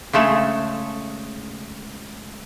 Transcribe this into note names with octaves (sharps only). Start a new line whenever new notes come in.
C#3 G#3 A3 A4